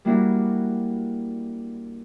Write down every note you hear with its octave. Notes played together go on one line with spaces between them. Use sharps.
G3 A#3 D4 E4 F#4